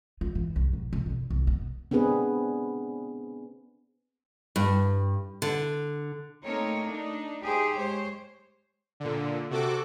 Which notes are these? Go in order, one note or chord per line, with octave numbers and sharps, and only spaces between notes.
F4
E3
C2
A#1
C3
D3
C2
B3
B3 C4 D4 G#4 B4
G2
D3
A3 A#3 C4 D#4 A#4 C#5
D4 D#4
D#4 G4 G#4 C5
G#3 C5 C#5
A#2 D3
C3 F#4 A4 D6